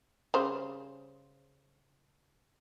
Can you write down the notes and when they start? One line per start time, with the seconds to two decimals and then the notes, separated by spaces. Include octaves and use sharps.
0.34 C#3 G3 C5